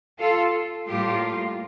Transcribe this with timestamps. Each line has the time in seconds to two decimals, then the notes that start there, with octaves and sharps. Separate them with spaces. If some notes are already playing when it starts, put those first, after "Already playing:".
0.18 F4 A4
0.87 A2 G3 A#3 F4 G4